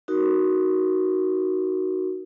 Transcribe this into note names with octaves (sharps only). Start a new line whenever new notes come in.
D#4 F#4 A#4